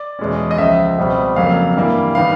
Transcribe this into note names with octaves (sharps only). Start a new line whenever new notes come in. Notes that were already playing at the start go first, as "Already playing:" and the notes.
Already playing: D5
E2 B2 G#3 C#4
D#5
C#2 C#3 F3 E5
C#2 B2 G3 C4
F2 C#3 F#3 A#3 F5
G2 E3 G3 A#3
D#3 G3 B3 F5